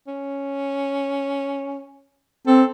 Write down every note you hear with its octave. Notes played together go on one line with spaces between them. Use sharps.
C#4
C4 A4